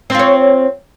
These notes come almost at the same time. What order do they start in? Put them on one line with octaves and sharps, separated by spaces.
C4 F4 C#5